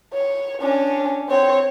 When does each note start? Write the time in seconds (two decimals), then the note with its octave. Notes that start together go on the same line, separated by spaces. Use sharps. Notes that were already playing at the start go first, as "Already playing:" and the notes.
0.13 C#5
0.62 C#4 D4
1.29 C4 C#5